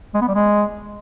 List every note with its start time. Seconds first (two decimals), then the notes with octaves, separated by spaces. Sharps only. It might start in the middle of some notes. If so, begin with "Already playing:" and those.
0.14 G#3
0.21 B3
0.28 G3
0.35 G#3